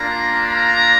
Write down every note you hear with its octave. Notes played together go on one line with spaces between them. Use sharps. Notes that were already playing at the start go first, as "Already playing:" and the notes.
Already playing: A#3 D4 F4 A#5
A#5